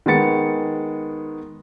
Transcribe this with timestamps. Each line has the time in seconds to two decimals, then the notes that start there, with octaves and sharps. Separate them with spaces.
0.06 D#3 G#3 B3 A6 C#7